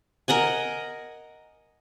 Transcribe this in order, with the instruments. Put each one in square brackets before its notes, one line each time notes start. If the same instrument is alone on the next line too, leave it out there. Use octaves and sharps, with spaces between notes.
[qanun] A#4 D#5 F#5 G#5